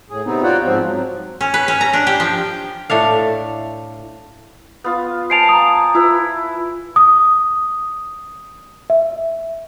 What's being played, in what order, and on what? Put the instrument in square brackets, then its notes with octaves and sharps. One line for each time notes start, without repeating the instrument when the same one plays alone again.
[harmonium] A2 G#4
C3 B3 C4 D#4
F4 F#4 C#5 D5 F#5 G5
G#2 F3 C4
F#3
[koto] C#4
B4
C#4
A#5
D4
G4
F3
[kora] A2 A3 D4 F5
[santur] B3 F4
[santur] C5 G#5 A5 [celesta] C7 D7 F7
[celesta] A#5 D#6
[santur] E4 B4 [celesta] F4
[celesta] D#6
E5